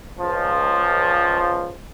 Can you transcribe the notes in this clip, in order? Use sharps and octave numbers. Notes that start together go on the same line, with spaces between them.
C#2 F3